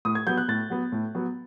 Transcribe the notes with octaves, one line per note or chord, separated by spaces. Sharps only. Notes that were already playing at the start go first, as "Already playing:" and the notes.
A2 D#6
G#6
F#3 B3 G6
F#6
A2 A6
F#3 B3
A2
F#3 B3